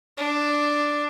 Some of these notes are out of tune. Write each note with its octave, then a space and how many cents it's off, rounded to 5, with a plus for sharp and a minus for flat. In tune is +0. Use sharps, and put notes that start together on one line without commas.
D4 +0